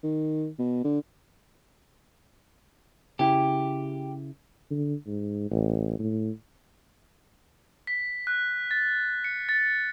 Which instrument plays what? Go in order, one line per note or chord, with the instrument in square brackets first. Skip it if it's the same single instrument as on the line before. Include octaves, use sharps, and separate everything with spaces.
[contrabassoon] D#3
B2
D3
[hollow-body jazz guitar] C#3 E4 [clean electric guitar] G4
[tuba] D3
G#2
A1
A2
[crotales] B6
F#6
A6
C#7
A6